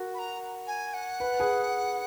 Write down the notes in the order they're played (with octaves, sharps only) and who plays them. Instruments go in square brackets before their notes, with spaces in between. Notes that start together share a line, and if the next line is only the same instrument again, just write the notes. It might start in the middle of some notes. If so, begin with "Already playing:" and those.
Already playing: [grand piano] F#4 A#4
[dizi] B5
A#5
G#5
F#5
[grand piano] B4
G#4 B4